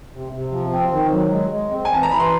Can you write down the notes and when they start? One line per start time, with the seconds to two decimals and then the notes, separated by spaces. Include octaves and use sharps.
0.13 C3
0.33 C3
0.52 F3
0.72 C4
0.92 D#3
1.11 F#3
1.31 G#3
1.51 G#3
1.71 C4
1.85 G#5
1.90 E3 A5
2.03 A#5
2.10 E3 B5
2.20 A#5 C6